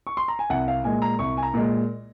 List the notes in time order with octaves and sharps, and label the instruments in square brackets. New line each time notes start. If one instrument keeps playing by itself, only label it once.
[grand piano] C#6
C6
A#5
G#5
C2 F#5
F5
A#2 G#3 G#5
A#5
C2 C#6
G#5
A#5
A#2 G#3